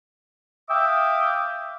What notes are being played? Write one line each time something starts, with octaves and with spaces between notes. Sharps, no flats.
E5 F5 G5 D6 D#6